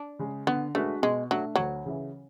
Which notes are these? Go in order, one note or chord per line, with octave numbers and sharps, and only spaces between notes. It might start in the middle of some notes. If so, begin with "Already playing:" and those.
Already playing: D4
C#3 G#3
D3 B3
G#3 A3 D4 F#4 B4
B2 G#3
F#3 A3 D4 A4
D2 F#3
C#3 E3